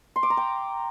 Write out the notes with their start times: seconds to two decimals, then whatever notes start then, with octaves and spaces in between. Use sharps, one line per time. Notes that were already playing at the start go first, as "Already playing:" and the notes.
0.16 C6
0.23 D6
0.30 A#5
0.37 G5